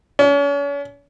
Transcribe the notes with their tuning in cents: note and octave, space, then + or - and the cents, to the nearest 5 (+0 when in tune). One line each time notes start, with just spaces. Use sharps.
C#4 +40